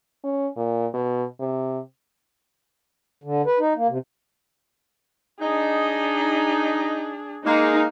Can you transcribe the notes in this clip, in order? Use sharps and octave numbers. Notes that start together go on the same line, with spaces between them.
C#4
A#2
B2
C3
D3
B4
D#4
A#3
C3
D4 D#4 G#4
G#3 A#3 D#4